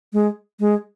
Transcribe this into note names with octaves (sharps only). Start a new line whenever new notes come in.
G#3
G#3